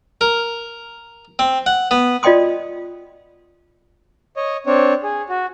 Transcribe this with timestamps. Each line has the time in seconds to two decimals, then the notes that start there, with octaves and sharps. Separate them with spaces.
0.21 A#4
1.39 C4
1.66 F#5
1.91 B3
2.23 F4 D5 D#5 G5 C6 D#6
4.36 C#5 D#5
4.67 C4 D4 C#5
5.03 G#4
5.29 F#4